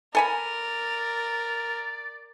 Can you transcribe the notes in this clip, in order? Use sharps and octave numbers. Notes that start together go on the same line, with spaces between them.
A4 A#4 D5 G#5 B5